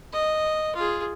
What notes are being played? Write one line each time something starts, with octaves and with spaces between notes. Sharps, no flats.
D#5
F4 G#4